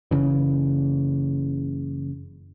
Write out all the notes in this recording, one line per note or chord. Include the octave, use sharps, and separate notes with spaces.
F#1 C#2 C#3 E3